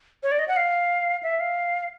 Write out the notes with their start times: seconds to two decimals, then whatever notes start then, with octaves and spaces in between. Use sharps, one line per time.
0.23 C#5
0.32 D5
0.39 D#5
0.48 F#5
0.57 F5
1.23 E5
1.40 F5